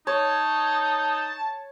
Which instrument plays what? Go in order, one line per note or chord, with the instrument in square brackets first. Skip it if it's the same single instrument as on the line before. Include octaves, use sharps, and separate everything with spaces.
[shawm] D#4 [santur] C#5 [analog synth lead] A5